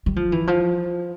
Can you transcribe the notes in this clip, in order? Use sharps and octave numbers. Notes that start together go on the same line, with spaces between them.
G3
F3
E3
F3